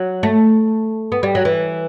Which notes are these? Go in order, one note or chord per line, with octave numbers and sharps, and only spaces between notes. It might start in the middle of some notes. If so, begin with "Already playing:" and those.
Already playing: F#3
A3
B3
G3
F#3
E3